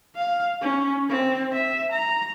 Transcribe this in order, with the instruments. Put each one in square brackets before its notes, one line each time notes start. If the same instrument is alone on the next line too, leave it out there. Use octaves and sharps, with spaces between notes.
[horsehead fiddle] F5
C#4
C4
E5
A#5